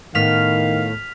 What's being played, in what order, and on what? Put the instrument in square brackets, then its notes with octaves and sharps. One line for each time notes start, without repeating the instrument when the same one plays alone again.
[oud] A2 B3 [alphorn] D#3 [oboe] F5 [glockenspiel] F6 B6 F7